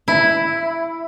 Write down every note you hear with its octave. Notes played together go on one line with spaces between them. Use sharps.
E4